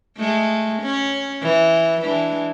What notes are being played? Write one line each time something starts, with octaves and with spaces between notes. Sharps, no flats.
G#3 A3
C#4
E3
E3 G#3 D4